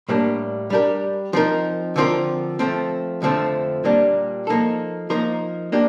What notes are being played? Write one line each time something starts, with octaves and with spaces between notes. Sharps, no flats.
A2 G3 A#3 D4
G3 D4 G4 A#4
F3 C4 D#4 A#4
D3 F3 C4 F4 A#4
F3 A3 C4
F2 D3 F3 A3 C4
A#2 G3 A#3 D4
F3 A#3 D#4 A4
F3 A#3 D#4 A#4
A#3 D4 G4